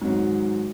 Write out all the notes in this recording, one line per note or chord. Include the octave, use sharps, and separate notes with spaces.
G#2 D#3 F#3